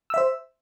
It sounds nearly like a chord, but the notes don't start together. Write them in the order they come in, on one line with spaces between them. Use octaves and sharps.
E6 E5 C5